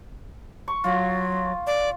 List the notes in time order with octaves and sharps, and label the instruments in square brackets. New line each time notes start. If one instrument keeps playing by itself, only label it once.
[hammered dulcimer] C#6
[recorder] F#3 [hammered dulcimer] F4
[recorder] D5